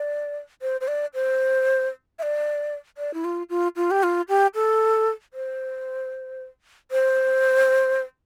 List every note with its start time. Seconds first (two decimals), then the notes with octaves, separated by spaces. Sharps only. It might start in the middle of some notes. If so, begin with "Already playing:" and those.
Already playing: D5
0.62 C5
0.81 C5
0.88 D5
1.14 C5
2.19 E5
2.23 D5
2.98 D5
3.14 E4
3.25 F4
3.50 F4
3.76 F4
3.91 G4
4.03 F4
4.29 G4
4.55 A4
5.34 C5
6.91 C5